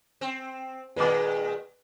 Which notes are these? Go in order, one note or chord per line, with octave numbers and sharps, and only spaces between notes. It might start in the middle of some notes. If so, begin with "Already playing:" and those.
C4
A#2 D#3 G#3 B4 D6